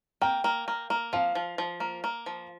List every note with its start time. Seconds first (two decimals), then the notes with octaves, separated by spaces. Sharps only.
0.22 A#3 G5
0.44 A#3
0.68 A#3
0.90 A#3
1.13 F3 F5
1.35 F3
1.58 F3
1.80 A#3
2.04 A#3
2.26 F3